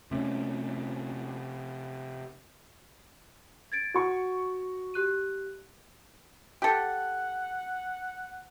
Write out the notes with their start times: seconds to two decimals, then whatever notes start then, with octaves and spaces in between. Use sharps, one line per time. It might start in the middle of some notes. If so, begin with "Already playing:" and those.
0.11 C3 A3 C#4
3.72 G#6 A6 D7
3.94 F#4 C#6
4.94 G4 F#6 D#7
6.62 G4 A4 F#5